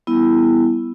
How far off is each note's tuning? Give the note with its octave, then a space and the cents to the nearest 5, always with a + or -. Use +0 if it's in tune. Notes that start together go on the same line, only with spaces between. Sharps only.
G3 +0 B3 +0 E4 +0